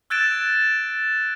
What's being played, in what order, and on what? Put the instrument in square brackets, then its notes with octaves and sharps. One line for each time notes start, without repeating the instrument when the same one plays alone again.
[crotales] E6 F#6 G#6 A6 D7 E7